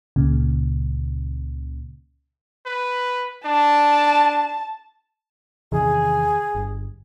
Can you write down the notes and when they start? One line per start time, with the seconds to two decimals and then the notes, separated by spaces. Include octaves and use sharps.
0.16 C#2 A#2 C#3
2.66 B4
3.45 D4 A5
5.72 E2 C3 D#3 G#4
6.55 G1